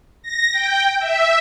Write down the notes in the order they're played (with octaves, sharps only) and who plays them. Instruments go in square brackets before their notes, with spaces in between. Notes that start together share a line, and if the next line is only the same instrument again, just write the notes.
[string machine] A#6
G5
E5